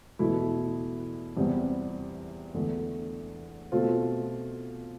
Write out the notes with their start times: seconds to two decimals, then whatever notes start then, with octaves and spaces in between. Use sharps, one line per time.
0.19 E2 B2 A3 E4
1.37 E2 C3 G3 B3
2.54 E2 D3 A3
3.72 B2 A3 C4 F4